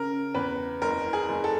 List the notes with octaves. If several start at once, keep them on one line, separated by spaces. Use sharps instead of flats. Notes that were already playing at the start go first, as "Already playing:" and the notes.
Already playing: C#3 A#4
E2 B4
F#1 A#4
G#4
F#1
A4